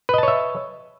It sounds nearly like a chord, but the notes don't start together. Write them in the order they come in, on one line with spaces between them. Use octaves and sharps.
B4 D#5 A5 C#5 E5